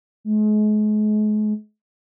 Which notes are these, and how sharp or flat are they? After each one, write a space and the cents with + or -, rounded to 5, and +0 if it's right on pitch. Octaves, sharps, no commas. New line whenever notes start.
G#3 +40